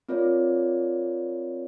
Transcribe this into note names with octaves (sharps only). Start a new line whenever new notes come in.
C4 F4 A#4 C#5 D5